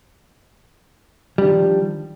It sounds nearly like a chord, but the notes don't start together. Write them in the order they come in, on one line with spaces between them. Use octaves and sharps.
G3 D4 D#3 F3